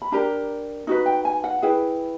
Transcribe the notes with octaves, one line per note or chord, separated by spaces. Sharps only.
B5
D4 G4 A#4 A#5
D#4 F#4 B4
G5
G#5
F#5
E4 G#4 B4 G5